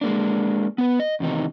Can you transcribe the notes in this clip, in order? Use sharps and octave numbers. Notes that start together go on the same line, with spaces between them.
G#3 A#3 D4
B3 B4
D#5
E2 C3 D#3 D#4